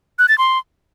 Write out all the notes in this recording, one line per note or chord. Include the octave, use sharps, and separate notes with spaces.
F#6
A6
C6